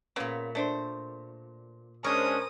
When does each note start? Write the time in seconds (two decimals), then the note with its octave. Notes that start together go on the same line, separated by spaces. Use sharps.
0.16 A#2 C#3 A#3 B3 E5
0.55 A3 D4 C5
2.04 G#3 C#4 D4 A#4 C5 C#6 D#6